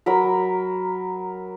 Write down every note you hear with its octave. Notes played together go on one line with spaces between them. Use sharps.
F#3 A#4 B5